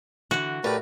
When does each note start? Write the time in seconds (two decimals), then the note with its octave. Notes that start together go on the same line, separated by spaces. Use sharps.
0.31 D3 E3 F#4
0.64 A2 A3 G4 A#4 B4 D5